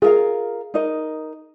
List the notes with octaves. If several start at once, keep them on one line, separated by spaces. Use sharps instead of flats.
F4 G#4 A#4 F5
D#4 A#4 D#5